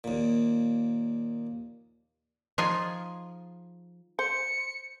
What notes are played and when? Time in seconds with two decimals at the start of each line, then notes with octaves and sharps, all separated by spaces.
0.04 D#2 A#2
2.58 F3 D#4 F4 G#4 G#5
4.19 C5 C#7